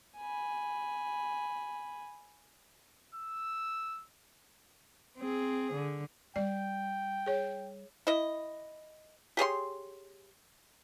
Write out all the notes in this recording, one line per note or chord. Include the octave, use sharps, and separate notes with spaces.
G#5 B5
E6
C4 G#4
D3
G3 D5 G5
G#4 C#5
E4 D#5
G4 G#4 C#5 C6